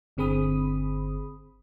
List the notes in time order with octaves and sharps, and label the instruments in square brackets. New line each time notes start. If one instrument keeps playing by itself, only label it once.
[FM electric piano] G1 D3 C4 G#4 B5 D#6